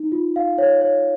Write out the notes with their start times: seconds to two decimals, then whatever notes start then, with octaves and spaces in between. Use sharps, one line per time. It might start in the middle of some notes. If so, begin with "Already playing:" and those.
Already playing: D#4
0.12 F4
0.36 F5
0.58 C#5
0.81 C#5